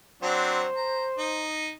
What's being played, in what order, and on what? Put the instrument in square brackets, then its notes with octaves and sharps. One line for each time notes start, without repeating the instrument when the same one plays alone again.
[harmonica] F#3 C4 D4 [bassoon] C5
[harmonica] A#5
D#4